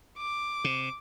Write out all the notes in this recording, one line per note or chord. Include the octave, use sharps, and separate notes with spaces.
D6
C3